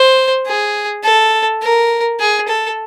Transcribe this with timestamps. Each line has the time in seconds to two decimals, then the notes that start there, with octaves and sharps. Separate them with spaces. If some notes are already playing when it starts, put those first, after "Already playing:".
Already playing: C5
0.46 G#4
1.04 A4
1.62 A#4
2.19 G#4
2.48 A4